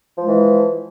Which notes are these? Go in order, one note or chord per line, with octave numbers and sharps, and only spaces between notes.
E3 F3 G#3